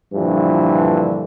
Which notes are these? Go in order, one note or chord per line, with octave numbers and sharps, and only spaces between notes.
G2 A#2 D3 E3 F3